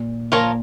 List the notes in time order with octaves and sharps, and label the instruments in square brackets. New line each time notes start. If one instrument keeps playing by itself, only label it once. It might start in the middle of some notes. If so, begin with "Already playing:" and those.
Already playing: [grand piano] A#2
[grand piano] A#2 [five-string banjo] F3 A#3 F4 A#4 C#5